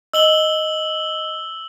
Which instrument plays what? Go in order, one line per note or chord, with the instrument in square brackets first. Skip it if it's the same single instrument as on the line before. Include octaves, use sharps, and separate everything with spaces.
[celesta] D#5 [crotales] E6 F#7 G7